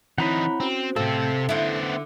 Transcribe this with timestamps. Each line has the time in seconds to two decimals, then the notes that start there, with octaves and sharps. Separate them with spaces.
0.18 E3 C4 D#4 E4 C#5 F#5 A#5 B5
0.60 C4 C#4 F#4 C5
0.96 A2 C3 C4 A4 F5
1.49 D3 B3 E4 C5